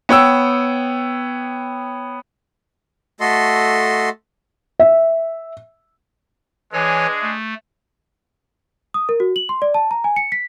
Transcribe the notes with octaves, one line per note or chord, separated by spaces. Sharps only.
B3 C#5 G5 E6
A3 F#4 A4 D#5 C6
E5
E3 G#3 D4 G#4 C#5 G#5
A3
D#6
A#4
F#4
F#7
C6
D5
A5
A#5
G#5
C#7
B6